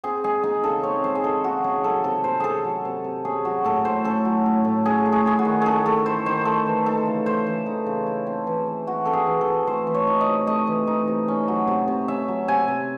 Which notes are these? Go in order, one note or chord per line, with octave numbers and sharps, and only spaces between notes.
C4 G#4
G#3 G#4
D#4 G#4
C#3 A4
C4 C#5
G#3 C5
G#4
D#4 A4
C#3 F#4
C#4 G#4
F#3 A4
C3 A4
C3 C5
C#4 G#4 A4
F#3
C3
C3
C#4 G#4
F#3 F#4
A2 A4
A2 C5
C#4 A4
F#3
A2
A2
C#4 G#4
A3
G#4
E4 G#4
F#4
D#3
C#4 G#4 A4
A3 A4
E4 C5
D#3 C5
A3 A4
E3
D#4 A4
C#3
A3 C5
E3
D#4
C#3
E4
C4
E3
E3
E4 F#4
C4 A4
G#4
E3
A4
E3
A3 C5
E3
C#5
D#4
D#5
C3
A3 D#5
E3
D#4
C3
C#4
F#3
C3
C3
C#4 E5
F#3
C3 G#5
C3